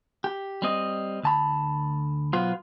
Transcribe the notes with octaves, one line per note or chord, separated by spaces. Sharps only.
G4
G3 C4 D#5
D2 A5 B5
B1 F#3 B3 F4 C5